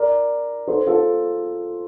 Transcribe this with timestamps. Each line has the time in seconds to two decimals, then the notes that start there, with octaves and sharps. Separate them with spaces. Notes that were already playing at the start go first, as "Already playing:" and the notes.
Already playing: A#4 D5
0.67 A4 C5
0.86 F4 A4